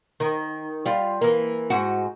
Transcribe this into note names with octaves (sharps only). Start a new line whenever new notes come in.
D#3
G3 F4
E3 A#3
G#2 F#4